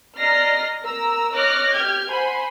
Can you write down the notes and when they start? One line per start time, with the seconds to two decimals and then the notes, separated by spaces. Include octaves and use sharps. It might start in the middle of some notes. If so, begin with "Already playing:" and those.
0.18 D5 D#5 A#5 F6 A#6 C7
0.82 A#4 A#5 E6
1.33 C#5 D#5 D6 F6 F#6 A#6
1.74 G4 F6 G6 G#6
2.09 C5 F#5 G#5 B5 C6